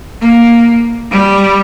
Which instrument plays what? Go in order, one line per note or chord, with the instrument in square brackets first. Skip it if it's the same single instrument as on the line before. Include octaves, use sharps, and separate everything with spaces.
[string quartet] A#3
G3